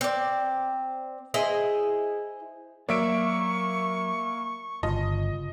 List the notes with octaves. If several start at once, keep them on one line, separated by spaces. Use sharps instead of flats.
C4 D5
E4 G#4 C5 D#5
F#3 A#3 C#5 D5 E5 C#6 D7
G1 C#3 F4 D#5 A5